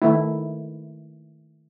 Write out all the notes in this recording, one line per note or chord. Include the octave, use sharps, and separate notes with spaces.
D#3 A3 E4